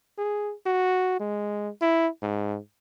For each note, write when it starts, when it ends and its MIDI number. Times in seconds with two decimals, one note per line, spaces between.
0.18 0.53 68
0.66 1.19 66
1.20 1.69 56
1.81 2.08 64
2.22 2.58 44